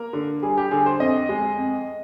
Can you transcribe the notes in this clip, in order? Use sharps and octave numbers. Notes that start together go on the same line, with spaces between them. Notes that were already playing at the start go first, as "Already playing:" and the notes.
Already playing: A#3 A#4
D3
G3 G#4
G4
D3 G#4
C5
F2 D#5
G#3
F2